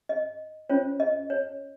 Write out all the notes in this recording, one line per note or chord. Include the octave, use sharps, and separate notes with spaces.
D#5
C#4 F4 C5 C#5
D#5
C#5